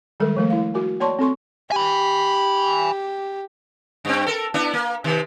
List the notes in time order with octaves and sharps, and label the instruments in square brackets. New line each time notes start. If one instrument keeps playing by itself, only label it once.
[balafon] D#3 G3 G#3 A4 A#4
F3 A3 A#4
E4 F5
F#4 A#4 G#5
A#3 C#5 D5 A5 C6 C#6
C4 A4 C6 C#6
[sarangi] G4 [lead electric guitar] G#5 B5
[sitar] G2 C4
A4 A#4
B3 D4 E4
A#3
C3 D#3